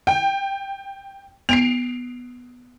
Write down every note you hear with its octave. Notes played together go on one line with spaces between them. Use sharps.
G5
B3 C7 D7 F7